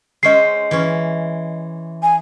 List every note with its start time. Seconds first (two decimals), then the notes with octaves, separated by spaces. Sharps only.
0.23 G#3 C#4 C5 D#5 C7
0.71 E3 C#4
2.03 G#5